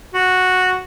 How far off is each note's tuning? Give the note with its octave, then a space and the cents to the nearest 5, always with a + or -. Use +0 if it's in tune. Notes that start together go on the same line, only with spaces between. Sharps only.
F#4 -5